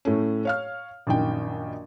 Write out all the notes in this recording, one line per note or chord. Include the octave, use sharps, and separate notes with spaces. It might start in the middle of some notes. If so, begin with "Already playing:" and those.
A2 A3 C#4
C#5 F5 F6
A#1 F#2 D#3 G5